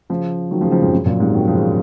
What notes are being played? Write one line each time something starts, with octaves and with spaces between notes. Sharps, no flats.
C#3 F3
D#3 F#3
C#3 F3
C#3 F3
F2 G#2
F#2
F#2 A#2
G#2 C3
D#3 F#3
C#3 F3